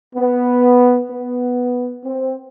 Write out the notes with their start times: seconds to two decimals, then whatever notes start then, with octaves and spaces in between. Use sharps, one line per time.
0.16 B3
1.11 B3
2.05 C4